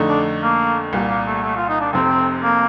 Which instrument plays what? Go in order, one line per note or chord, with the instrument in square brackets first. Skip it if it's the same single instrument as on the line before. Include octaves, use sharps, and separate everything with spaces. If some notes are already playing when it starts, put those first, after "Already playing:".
Already playing: [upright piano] F2 D3 A3 D#4
[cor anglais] D4
A#3
[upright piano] C2 A#2 G3
[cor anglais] A#3
A3
A3
F4
D#4
D4
[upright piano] F1 F2 C3 [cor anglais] C4
[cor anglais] A#3